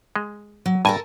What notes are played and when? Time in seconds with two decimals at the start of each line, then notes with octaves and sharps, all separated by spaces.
0.16 G#3
0.66 F#3
0.85 G2 A4 A#4 G#5 A5